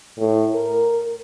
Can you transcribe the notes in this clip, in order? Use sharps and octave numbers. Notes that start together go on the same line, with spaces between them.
A2
A#4